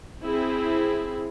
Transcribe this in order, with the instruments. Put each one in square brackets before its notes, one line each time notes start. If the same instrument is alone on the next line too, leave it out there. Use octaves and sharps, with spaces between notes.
[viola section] C4 E4 G#4